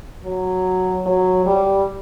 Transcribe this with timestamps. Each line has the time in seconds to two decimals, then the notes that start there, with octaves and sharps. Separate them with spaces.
0.25 F#3
1.06 F#3
1.46 G3